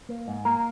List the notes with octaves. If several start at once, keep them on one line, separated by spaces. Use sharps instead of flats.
A#3
G#2
A#3 A#4